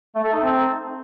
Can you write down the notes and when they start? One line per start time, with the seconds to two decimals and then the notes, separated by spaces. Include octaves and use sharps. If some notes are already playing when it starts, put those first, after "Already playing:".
0.15 A3
0.24 A4
0.33 D#4
0.42 C4